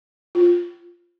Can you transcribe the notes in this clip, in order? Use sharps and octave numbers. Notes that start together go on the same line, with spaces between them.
F4